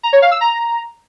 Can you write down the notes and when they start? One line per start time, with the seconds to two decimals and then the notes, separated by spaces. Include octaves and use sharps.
0.03 A#5
0.13 C#5
0.22 F5
0.31 E6
0.41 A#5